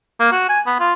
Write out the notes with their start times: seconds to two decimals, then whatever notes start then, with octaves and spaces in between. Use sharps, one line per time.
0.20 A#3
0.32 F#4
0.49 G#5
0.66 B3
0.80 F4